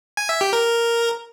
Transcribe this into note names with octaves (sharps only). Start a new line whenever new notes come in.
G#5
E5
G4
A#4